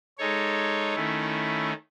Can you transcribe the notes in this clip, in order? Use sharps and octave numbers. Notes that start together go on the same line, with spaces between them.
G#3 D#4 A4 C#5
D#3 A3 C#4 E4